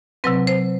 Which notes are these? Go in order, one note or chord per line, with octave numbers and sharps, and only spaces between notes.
C3 F#3 C4 B4
C5